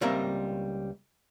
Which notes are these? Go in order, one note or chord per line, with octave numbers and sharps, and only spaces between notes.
C#2 G3 A#3 C4 A#4 E5